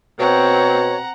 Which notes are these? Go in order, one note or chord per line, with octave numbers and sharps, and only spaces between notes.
B2 C4 C#5 F#5 A#5